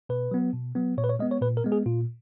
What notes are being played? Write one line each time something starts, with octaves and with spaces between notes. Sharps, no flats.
B2 B4
F#3 B3
B2
F#3 B3
A#2 C#5
B4
C#5
G#3 B3 D#5
C#5
A#2 B4
A#4
G#3 B3
G#4
A#2 F4